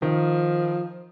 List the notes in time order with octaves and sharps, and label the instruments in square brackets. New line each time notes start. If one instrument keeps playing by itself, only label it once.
[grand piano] D#3 [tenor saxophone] F3